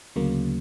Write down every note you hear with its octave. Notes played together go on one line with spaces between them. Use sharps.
D2 C#3 F#3 A#3